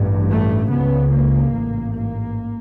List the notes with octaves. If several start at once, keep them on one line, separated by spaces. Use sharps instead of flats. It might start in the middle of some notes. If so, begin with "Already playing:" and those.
Already playing: A1 G2
A3
C#2 C#3 B3
A#3
A1 G#2
A#3